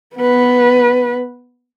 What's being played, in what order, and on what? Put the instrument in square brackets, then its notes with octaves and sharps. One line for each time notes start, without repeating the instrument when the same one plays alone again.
[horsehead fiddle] B3 B4